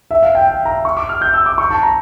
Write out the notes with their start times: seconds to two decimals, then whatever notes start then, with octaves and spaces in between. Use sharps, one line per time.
0.11 E5
0.23 F5
0.35 G5
0.48 G5
0.65 A#5
0.85 C#6
0.97 D6
1.09 F6
1.21 G6
1.34 E6
1.46 D6
1.58 C#6
1.71 A5
1.83 A#5